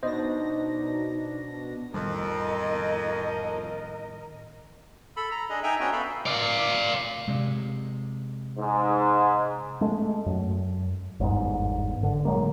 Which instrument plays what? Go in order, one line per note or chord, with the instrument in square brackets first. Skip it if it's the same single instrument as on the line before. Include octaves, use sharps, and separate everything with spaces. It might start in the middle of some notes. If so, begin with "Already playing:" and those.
[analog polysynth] B2 D4 A#6 [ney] D#4 [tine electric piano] C5 D#5
[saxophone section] F2 [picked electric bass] A2 D#3 G3 [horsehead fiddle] A#4 D#5
[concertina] A4 B5
A#5
D4 G#4 D#5
D#4 E5 G5 G#5 A#5
B3 C#4 D4 F#4 G5
A4 E5 F5 B5
[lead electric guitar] D5 F5
[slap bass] C3 G#3
[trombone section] G#2
[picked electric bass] G#3 A3
F#2
G1 E2 G#2
D3
A2 F#3 G#3 A#3